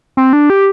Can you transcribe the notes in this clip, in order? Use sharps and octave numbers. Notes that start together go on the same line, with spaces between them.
C4
D4
G4